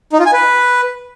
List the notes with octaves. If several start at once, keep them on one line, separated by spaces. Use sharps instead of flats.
D#4
F4
G#5
B4